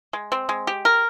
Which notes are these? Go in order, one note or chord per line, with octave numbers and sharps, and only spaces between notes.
G#3
C4
G#3
G4
A#4